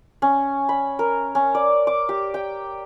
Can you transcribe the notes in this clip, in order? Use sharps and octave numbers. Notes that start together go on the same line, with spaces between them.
C#4
B5
A#4
C#4
D5
D6
G4
G5